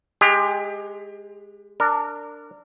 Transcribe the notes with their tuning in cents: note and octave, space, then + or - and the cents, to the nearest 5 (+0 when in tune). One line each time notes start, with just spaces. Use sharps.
G#3 +0 G4 +30
D4 +0 A#4 -25